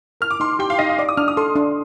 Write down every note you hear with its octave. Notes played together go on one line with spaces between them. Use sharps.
A#4 F6
D6
D#4 C6
G4 G5
F5
D#4 D#5
F5
D5 D6
D#6
D4 F6
D#6
A4 C6
D4